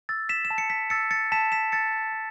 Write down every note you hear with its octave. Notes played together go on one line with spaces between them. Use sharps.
E6 A6
B6 E7
E7
A5
C#7
B6
E6 A6 C#7
A6 C#7
A5 B6 E7
B6 E7
E6 A6 C#7
A5